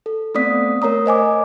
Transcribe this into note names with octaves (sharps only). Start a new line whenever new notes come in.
A4
A3 B3 C4 D5 D#6 B6
A3 A#4 C#5 A#5 D#6
C5 D#5 G#5 D6